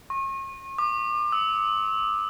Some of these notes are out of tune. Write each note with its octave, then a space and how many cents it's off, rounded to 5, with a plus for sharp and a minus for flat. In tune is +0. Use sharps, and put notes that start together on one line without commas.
C#6 -40
D6 +35
E6 -25